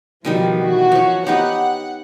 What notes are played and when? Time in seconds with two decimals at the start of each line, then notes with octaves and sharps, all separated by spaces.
0.25 B2 D#3 F3 G3
0.61 E3 F#4
0.92 F3 C#5
1.27 B3 D#4 G4 F#5